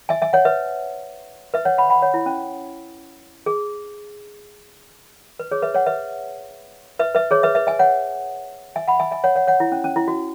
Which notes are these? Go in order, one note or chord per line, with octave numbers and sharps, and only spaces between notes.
E5 G#5
E5 G#5
C#5 F#5
B4 E5
B4 E5
C#5 F#5
F#5 B5
F#5 B5
C#5 F#5
E4
C#4
G#4
B4
G#4 C#5
B4 E5
C#5 F#5
B4 E5
B4 E5
B4 E5
G#4 C#5
B4 E5
B4 E5
E5 G#5
C#5 F#5
E5 G#5
F#5 B5
E5 G#5
E5 G#5
C#5 F#5
C#5 F#5
C#5 F#5
E4
C#4
C#4
E4
F#4